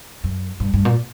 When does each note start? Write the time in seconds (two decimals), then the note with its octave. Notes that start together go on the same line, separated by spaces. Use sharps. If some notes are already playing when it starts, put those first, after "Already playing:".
0.24 F#2
0.60 G2
0.73 G2
0.85 A#2